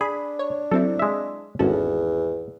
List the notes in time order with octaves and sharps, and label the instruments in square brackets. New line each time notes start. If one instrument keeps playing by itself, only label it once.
[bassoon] D4 [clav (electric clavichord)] G#4 [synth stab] B5
[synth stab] C#5
[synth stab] F#3 C4 E4 [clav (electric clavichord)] A4
[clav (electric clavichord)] G#3 E5
[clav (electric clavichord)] G#1 A5 [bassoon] E2 [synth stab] C#4 F#4 A4